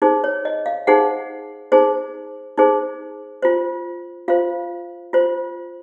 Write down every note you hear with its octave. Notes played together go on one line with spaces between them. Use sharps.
D#4 G#4 C5
C#5
D#5
F5
D#4 G#4 C5 F#5
D#4 G#4 C5
D#4 G#4 C5
F4 C5
F4 C5 F5
F4 C5